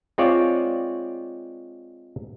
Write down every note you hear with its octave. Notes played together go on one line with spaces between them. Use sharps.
G#3 C4 F4 C#5 D5